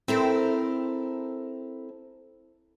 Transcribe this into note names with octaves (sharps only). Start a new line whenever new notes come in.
C4 E4 A4 A#4